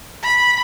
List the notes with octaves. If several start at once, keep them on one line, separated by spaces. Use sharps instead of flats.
B5